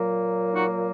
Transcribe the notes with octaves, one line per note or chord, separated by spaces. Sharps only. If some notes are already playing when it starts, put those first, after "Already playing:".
Already playing: A#2 F#3 A#3
D#4 F#4